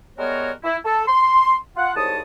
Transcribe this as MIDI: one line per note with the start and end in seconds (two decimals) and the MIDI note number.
0.18 0.51 55
0.18 0.51 56
0.18 0.51 59
0.18 0.51 66
0.18 0.51 70
0.18 0.51 73
0.64 0.76 64
0.85 1.06 69
1.07 1.55 84
1.76 1.95 65
1.76 1.95 78
1.96 2.21 36
1.96 2.21 44
1.96 2.21 73
1.96 2.21 81
1.96 2.21 87